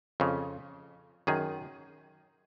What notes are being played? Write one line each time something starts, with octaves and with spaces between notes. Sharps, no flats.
F2 C#3
F#2 D#3 G#4